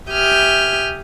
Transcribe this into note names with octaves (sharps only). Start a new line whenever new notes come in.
G4 E5 G#5 D#6 F6 G6